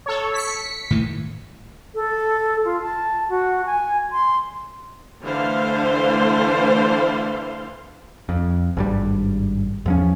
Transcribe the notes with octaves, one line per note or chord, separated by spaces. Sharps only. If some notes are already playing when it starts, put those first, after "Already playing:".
A4 C#5
B6 C#7
A2 D#3 E3
A4
F4
A5
F#4
G#5
C6
D3 E3 A3 C5 F5 C6
F2
G#1 G2 G3
E2 F3 C#4